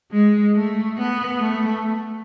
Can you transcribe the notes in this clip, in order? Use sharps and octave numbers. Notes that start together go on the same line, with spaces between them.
G#3
A3
B3
A3